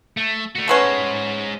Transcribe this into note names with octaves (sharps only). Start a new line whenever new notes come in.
A3
A3 F#4
G#3 A3 B3 C#4 C5